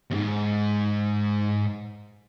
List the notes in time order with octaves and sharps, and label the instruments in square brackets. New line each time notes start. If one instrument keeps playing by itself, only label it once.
[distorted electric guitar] D#2 G#2